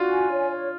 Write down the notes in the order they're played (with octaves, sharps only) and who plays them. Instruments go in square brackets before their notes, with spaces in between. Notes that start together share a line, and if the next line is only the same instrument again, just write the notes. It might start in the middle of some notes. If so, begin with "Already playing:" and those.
Already playing: [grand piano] D4 F4 [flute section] F#4
[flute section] G#5
C#5
C#5